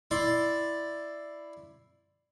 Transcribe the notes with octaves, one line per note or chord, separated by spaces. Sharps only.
E4 D5 C6